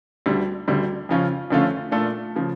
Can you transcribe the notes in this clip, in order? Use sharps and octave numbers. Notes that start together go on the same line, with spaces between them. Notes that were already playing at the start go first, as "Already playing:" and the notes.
D2 D3 G3
D2 D3 G3
F2 C#3 F3 C#4 F4
F2 D3 A3 C#4 F4
A#2 A3 D4 F4 A4
C#3 F3